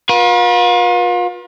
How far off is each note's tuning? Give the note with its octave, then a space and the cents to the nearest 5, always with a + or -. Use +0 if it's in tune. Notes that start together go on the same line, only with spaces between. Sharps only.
F4 +35 B4 -40